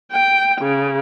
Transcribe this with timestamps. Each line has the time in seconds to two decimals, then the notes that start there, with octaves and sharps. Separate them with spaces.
0.13 G5
0.62 C#3